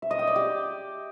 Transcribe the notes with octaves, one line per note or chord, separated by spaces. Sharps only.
E5
D#5
G5
D5
G4